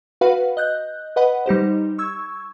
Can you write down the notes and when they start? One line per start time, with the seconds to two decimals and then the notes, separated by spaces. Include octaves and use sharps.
0.21 F#4 B4 F5 F#5 B5
0.57 D#5 F#6 G6
1.16 B4 D#5 F#5 B5
1.46 G3 D#4 G4 C5
1.98 C#6 E6 G#6